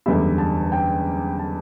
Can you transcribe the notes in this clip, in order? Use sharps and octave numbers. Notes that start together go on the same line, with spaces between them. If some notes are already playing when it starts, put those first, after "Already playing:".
F#1 E2 D3 G3 E5
A5
G5
A5